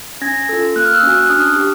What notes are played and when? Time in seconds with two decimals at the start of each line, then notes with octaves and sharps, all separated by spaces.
0.22 C#4 G#6 A#6
0.49 F4 A4
0.76 A#3 F#6
0.85 F6
0.94 E6 F#6
1.03 C#4 F#4
1.23 F#6
1.29 D4 D#6 F6
1.56 G4